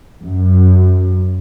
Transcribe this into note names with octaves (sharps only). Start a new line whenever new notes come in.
F#2